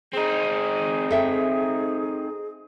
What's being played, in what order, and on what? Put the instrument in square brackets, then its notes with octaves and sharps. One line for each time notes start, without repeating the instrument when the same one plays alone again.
[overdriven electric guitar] C4 D#4 [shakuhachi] G#4
[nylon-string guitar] A4 E5 G5